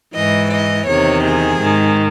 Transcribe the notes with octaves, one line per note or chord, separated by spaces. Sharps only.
G#2 E3 D#5
D#5
E2 C3 D#3 C#5
G#4
G#2 D#3